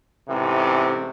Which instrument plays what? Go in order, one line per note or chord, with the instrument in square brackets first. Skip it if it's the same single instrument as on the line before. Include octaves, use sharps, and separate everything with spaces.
[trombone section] A1 G#2 C3